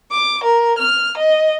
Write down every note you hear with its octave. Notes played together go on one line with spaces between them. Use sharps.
D6
A#4
F6
D#5